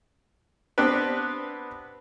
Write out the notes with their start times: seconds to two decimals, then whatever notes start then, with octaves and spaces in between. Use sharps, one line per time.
0.78 B3 C4 D4 G4 B4